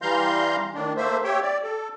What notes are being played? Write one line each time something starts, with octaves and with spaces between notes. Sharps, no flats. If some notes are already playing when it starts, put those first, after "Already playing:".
E3 G3 F5 A#5 C6 G6
A2 D#3 D4
A3 A#3 C5 E5
G4 C#5 E5 G5
D5
A4